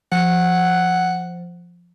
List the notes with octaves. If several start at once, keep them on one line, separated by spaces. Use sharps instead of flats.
F3 F#5